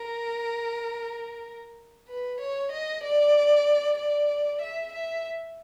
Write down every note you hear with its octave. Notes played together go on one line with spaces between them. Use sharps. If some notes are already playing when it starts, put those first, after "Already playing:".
Already playing: A#4
B4
C#5
D#5
D5
D5
E5
E5